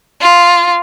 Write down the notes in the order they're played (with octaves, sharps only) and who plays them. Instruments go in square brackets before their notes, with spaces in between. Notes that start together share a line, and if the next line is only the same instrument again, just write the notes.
[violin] F4